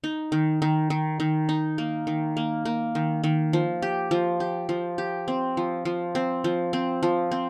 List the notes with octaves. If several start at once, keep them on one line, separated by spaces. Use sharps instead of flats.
D#4
D#3
D#3
D#3
D#3
D#4
A#3
D#3
A#3
A#3
D#3
D#3
F3
G4
F3
G4
F3
G4
C4
F3
F3
C4
F3
C4
F3
C4